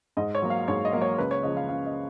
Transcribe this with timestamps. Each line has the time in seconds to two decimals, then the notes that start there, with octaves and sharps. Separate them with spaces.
0.17 G#2 D#5
0.35 C#5
0.42 F#3 A#3
0.50 F5
0.68 G#2 C#5
0.85 D#5
0.93 F#3 A#3
1.02 C#5
1.18 C#2 B4
1.31 C#5
1.43 C#3 F3 D#5
1.57 F5
1.69 C#2 F5
1.86 D#5